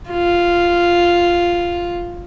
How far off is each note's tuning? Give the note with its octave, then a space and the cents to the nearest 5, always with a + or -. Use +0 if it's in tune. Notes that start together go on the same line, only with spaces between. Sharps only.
F4 -5